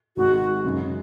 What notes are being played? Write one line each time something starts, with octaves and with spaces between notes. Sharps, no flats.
G#1 G#2 D#3 G#3 F#4
F#2 C#3 G#3